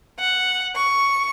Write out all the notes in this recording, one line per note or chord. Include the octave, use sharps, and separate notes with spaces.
F#5
C#6